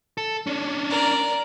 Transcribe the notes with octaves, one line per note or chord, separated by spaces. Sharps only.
A4
C#4 D4
A#4 D5